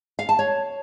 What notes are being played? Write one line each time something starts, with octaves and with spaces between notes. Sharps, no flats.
F5
A5
C#5